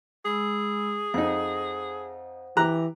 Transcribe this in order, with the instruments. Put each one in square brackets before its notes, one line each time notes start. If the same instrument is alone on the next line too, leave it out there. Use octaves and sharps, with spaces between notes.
[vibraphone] G#3 B5 E6 [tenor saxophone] G#4
[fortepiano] F2 D#4 [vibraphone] C5 F#5
[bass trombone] E3 [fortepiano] G4 A#5 F#6